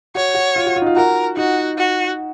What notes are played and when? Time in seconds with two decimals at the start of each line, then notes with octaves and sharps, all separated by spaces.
0.15 F#4 C#5
0.35 F#4
0.56 F4
0.66 F#4
0.76 F4
0.82 D#4
0.86 F4
0.96 F#4 A#4
1.37 D#4 F#4
1.78 F#4